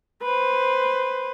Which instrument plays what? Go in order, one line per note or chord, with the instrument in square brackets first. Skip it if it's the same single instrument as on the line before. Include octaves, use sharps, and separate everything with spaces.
[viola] B4 C5